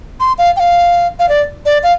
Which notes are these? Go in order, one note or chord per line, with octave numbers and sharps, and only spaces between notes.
C6
F5
G5
F5
F5
D5
D5
F5